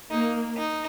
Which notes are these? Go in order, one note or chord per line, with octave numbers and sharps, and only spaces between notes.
A#3 D#4
D#4